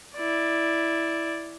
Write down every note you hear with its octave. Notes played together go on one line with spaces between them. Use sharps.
E4 D5